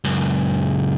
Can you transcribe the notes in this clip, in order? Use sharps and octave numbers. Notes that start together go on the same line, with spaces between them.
C#2 F#2